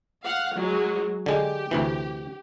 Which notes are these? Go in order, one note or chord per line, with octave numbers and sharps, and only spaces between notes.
F5 F#5
F#3 G#3
D3 G#3 G4
D2 C3 E3